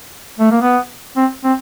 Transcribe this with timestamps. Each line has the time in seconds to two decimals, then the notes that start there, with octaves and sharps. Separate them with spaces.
0.39 A3
0.51 A#3
0.62 B3
1.17 C4
1.44 C4